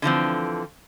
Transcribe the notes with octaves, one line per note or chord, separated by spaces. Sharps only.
D3 E3 F3 C4